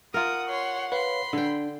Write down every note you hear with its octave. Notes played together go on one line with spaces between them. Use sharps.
F4 A#4 F#5 D#6
C#5 C6
B4 C#5 F5 B5 C6
D3 D4 G5